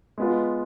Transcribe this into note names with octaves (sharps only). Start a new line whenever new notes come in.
G#3 B3 F4